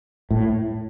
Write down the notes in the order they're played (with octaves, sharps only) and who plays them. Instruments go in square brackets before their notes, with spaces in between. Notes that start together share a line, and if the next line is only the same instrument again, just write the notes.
[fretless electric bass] A2